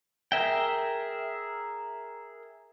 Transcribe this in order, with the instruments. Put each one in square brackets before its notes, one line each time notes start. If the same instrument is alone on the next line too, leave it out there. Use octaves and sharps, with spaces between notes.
[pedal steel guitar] G#4 A#4 E5 G5